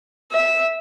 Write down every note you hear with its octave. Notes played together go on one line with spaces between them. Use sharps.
E5